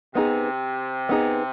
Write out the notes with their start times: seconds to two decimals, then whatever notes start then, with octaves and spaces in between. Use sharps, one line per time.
0.15 C3 B3 D#4 G#4
1.09 B3 D#4 G#4